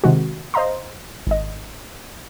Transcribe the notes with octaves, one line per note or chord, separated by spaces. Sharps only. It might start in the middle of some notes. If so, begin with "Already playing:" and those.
C3 D#3 G#3 F#4
C5 D#5 F5 A#5 C6
G#1 D#5